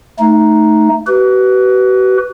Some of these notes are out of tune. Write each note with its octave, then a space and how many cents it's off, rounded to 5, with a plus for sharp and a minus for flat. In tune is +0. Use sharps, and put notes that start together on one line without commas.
A3 +0 D#4 +0
F#4 +45 B4 +0